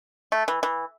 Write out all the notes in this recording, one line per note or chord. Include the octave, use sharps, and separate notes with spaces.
A3
E3
E3